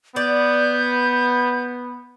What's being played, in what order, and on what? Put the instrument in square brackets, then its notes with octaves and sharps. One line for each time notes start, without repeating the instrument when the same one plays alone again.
[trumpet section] B3 [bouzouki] D5 [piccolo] G6